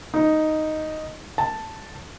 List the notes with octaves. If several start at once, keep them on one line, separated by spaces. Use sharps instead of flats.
D#4
A5